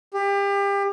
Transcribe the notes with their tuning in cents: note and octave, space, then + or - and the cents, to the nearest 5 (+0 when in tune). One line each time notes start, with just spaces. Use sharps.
G4 +30